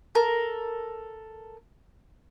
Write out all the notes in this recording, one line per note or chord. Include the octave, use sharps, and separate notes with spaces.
A4 A#4